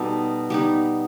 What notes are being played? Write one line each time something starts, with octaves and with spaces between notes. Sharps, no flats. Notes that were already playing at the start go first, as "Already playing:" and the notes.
Already playing: B2 G3 D#4 A4
G3 B3 D#4